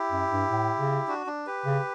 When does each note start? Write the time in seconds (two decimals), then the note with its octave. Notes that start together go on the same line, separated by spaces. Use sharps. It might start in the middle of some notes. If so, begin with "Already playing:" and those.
Already playing: E4 G4
0.11 F#2
0.31 G2
0.50 A2
0.79 C#3
1.08 D4 F#4
1.27 D4
1.47 G4 B4
1.66 C#3